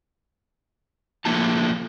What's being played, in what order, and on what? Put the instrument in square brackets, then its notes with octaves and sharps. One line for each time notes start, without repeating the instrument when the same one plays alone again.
[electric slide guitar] F3 A3 A#3 F4 A5